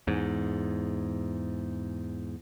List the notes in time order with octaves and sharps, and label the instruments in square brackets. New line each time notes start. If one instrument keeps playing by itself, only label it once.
[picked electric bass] E2 G#2